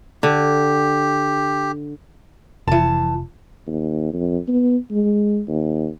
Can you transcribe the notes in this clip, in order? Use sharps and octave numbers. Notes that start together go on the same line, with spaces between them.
D3 G4
F1 E3 A5
D#2
F2
B3
G#3
D#2